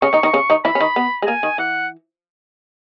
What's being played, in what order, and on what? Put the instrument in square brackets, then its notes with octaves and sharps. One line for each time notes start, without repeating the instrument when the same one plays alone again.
[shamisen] C#3 C#4 [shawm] C#6
[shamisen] D#3 D#4
D#3 D#4
C#3 C#4
D#3 D#4
[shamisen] E3 E4 [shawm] B5
[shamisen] C#4
D#3 D#4
B3
G#3
[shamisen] A#3 [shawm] G#5
[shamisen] D#3
[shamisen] E3 [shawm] F#5